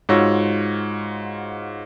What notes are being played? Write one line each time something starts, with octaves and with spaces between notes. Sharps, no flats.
G#2 F4 F#4 C#5 E6 A#6